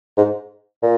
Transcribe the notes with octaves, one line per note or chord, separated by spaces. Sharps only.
G#2
A#2